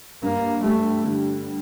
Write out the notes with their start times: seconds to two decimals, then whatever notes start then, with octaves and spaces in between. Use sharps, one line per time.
0.23 G2 A#3
0.63 G3 A3
1.05 D3